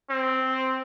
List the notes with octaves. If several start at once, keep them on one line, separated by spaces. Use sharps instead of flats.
C4